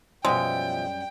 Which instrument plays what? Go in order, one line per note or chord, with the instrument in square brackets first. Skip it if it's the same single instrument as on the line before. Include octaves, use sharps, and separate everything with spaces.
[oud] F#2 G3 C#4 [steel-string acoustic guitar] B2 F3 E5 [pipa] G#3 [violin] G5